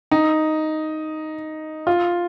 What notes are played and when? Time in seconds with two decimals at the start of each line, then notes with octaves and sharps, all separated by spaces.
0.11 D#4
1.87 F4